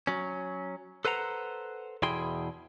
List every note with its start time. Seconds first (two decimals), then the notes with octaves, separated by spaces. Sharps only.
0.07 F#3 C#4
1.05 A4 B4 C5 F#5 A#5
2.02 E2 B2 E4 G#4 G5 C6